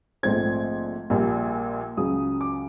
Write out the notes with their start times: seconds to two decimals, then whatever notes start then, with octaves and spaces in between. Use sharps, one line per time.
0.23 A#1 G#2 F3 A3 C4 G#6
1.10 A#1 A#2 G3
1.97 C#2 C#3 F#3 D#6
2.41 D6